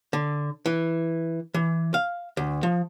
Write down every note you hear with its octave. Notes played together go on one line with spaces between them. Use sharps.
D3
E3
E3
F5
D2
F3